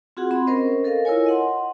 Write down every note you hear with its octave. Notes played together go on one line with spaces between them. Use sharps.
C4 F4 F#4 G#4 F#5
C4 B5 C6
C#4 A#4 C5 D#5
A4 A#4 D#5 F5
E4 F4 A#4 C#5 G#5
D#5 F#5 C6